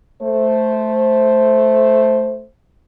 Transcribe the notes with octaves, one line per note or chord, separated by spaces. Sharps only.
A3 C5